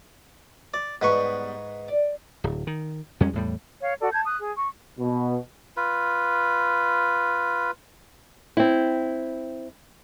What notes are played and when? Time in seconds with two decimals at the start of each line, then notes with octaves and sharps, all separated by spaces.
0.74 D5
1.02 G#2 G3 B3 B4 C#6
1.88 D5
2.44 D1
2.67 D#3
3.20 F2 G3 G#3 C#4
3.33 E2 A2 G3
3.82 C#5 F5
4.00 F#4 A4 D5
4.12 A5 G6 G#6
4.25 D#6 F#6
4.39 G#4
4.56 C#6
4.98 B2
5.77 F4 B4
8.57 C4 E4